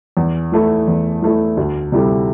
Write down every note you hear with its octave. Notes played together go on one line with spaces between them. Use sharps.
E2
E3 A3 E4
E2
E3 A3 E4
D2
C3 G3 E4 A4